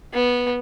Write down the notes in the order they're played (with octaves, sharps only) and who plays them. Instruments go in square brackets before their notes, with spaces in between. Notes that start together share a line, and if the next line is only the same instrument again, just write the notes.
[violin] B3